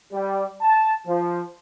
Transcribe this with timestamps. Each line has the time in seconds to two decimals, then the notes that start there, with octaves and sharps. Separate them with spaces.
0.13 G3
0.62 A5
1.07 F3